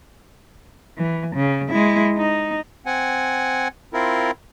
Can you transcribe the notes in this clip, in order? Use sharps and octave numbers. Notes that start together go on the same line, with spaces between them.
E3
C#3
G#3 E4
D#4
C4 F#5 G#5
C4 E4 F4 A#4